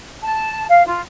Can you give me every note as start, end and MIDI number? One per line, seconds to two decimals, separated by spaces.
0.23 0.64 81
0.69 0.82 77
0.86 1.00 65